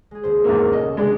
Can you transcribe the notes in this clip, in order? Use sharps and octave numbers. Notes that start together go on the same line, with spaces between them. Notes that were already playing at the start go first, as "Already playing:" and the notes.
G#3 G#4
D#1 C#2 C5
E2 G#2 A#3 C#4 F6
B2 D#4 A4 D#5
C3 F#3 G#3 D4 G#4